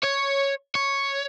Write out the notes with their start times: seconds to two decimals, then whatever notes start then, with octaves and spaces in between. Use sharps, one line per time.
0.04 C#5
0.75 C#5